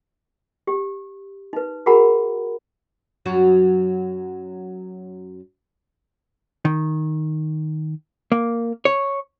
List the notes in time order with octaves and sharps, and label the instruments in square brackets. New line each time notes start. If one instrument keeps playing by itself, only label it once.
[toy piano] G4
D#4 B4
F#4 G#4 A#4 F#5 A#5 B5
[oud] F#2 F#3 F#4
[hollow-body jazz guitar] D#3
A#3
C#5